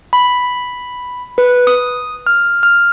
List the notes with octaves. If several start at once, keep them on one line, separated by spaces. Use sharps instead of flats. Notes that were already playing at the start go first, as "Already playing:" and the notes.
B5
B4
D#6
F6
F6